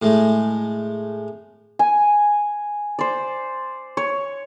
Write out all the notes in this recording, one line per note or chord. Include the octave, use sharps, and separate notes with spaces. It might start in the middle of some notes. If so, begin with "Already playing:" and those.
A2 G#3 A3
G#5
C5 D5
C#5